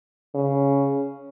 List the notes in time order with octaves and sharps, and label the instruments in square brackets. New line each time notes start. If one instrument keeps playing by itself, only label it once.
[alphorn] C#3